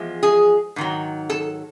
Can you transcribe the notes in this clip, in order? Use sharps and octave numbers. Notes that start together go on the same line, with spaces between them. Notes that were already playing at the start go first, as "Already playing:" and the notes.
Already playing: E2 F3 G#3
G#4
G#2 D#3 F#3
A4